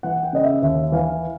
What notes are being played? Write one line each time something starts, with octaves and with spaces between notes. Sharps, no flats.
E3 F#5
G5
C#3 D#5
E5
D#2 E5
E3 F5